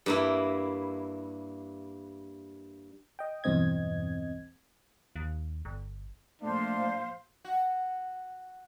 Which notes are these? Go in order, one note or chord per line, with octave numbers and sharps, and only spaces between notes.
G2 A#3 E4
D#5 G5
B1 E2 G2 C4 D#5 G#6
D#2
G1
A#2 F3 A3 D4 C5 F5
F#4